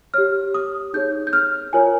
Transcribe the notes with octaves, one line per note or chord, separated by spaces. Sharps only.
G4 C#5 F6
D#6
D#4 G#4 C#5 G6
G6
F6
F4 A#4 C#5 G#5